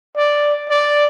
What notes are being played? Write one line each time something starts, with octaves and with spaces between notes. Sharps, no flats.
D5
D5